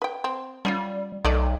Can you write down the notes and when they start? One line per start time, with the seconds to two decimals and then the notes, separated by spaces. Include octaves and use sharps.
0.02 B4 G5
0.24 C4
0.65 G3 C#4 E4 F4
1.25 B1 A3 D5 D#5